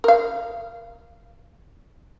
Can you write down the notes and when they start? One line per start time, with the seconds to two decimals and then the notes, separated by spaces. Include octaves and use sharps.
0.04 A#4 F5